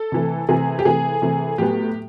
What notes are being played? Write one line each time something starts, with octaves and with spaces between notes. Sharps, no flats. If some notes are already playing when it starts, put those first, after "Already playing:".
Already playing: A4
C3 E3 A3
C3 E3 A3 G#4
G4
C3 E3 A3 G#4
C3 E3 A3
A2 F#3 B3 G4